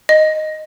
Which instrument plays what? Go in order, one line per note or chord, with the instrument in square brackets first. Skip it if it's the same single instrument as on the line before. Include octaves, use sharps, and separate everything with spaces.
[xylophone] D#5